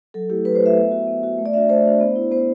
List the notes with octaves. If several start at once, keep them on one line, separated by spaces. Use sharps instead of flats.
F#3 A4
A3 E4 G4
F#3 B4
C5
A3 E4 E5
B3
F#4
B3
F#4
A3
D5
D4 F#4 E5
A3 C5
D4 F#4
B3
E4
B3 C5